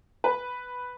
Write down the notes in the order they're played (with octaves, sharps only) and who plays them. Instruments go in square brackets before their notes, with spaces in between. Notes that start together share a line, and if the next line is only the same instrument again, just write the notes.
[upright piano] B4